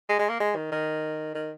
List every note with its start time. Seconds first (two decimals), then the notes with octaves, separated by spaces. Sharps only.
0.09 G#3
0.19 G#3
0.30 A#3
0.40 G#3
0.56 D#3
0.72 D#3
1.35 D#3